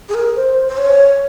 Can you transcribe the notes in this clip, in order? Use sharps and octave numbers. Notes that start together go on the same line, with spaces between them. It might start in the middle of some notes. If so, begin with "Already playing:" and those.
G#4
A#4
C5
C5
C#5